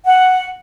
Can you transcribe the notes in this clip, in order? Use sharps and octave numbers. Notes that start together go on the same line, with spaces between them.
F#5